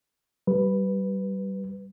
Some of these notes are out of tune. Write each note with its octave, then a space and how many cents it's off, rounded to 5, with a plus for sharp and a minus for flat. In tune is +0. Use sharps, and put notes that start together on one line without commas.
G3 -25 B4 +0